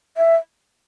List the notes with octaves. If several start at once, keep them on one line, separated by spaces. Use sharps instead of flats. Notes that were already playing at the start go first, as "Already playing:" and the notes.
E5